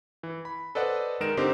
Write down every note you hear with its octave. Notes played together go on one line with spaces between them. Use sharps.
E3
B5
A4 B4 C5 D5 D#5 F#5
D#3 G#3 D#4 A#4 D7 E7
D3 C4 D#4 G4 C5